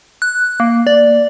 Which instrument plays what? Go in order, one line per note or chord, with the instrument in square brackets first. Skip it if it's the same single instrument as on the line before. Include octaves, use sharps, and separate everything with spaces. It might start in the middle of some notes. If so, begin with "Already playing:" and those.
[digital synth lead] F#6
A#3
D5